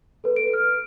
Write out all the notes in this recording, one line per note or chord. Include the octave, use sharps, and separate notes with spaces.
A4 B4
D7
F6